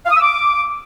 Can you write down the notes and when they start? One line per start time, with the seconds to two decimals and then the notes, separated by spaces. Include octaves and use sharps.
0.05 F5
0.10 D#6
0.15 E6
0.20 D6